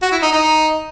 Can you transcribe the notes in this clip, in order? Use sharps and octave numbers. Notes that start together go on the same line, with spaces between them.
F#4
E4
D#4
D#4